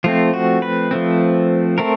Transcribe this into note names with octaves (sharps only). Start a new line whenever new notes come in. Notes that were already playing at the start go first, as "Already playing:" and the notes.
F3 A3 C4 F4
F#4
B4
F3 A3 C4
A3 C4 A#4